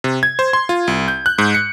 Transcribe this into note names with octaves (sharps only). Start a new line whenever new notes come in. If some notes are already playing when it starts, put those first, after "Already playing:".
C3
G#6
C5
C6
F4
C2
G6
F#6
G#2
C#7